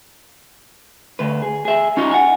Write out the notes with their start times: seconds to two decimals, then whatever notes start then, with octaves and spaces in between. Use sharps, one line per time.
1.19 D2 B4
1.42 G#4
1.65 G#4 E5
1.97 C#4 D#4 F4
2.11 F#5 G#5